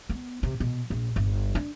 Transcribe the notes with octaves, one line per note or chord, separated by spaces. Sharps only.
B3
C3
B2
A#1
G1
D4